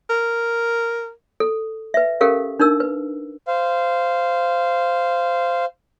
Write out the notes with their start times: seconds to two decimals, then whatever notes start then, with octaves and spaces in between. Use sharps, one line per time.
0.10 A#4
1.40 A4
1.94 B4 E5
2.21 C#4 G4 A4 A#4 F5
2.60 D4 D#4 A#4 E6
2.80 B4
3.48 C5 F5